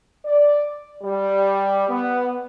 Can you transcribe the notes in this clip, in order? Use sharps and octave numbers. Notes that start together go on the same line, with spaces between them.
D5
G3
B3